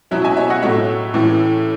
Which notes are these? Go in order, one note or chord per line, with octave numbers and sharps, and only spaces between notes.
B2 F#3 C#4 E4
E5 G#5
C#5 E5
D#5 F#5
A2 F#3 A3 E4 C#5 E5
A2 E3 A3 C#4